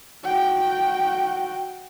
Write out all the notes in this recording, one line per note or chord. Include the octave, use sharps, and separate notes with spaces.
F#4 G5